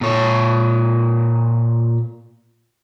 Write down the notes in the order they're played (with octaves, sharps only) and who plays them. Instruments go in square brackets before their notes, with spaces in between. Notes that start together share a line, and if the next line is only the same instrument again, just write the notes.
[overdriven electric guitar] A#2 C#5